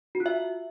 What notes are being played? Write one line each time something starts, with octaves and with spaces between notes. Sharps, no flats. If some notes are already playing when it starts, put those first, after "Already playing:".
F#4
F4
E5